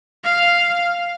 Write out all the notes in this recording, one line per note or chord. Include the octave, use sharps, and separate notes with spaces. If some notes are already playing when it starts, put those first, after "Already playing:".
F5